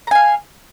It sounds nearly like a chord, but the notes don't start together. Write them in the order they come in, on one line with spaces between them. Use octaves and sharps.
A#5 G#5 F5